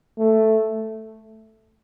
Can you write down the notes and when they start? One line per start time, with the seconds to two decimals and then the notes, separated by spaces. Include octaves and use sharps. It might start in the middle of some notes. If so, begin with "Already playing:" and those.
0.18 A3